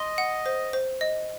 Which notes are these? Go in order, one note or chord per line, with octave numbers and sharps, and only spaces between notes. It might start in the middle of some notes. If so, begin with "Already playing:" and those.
Already playing: D#5 C6
F#5
C5
C5
D#5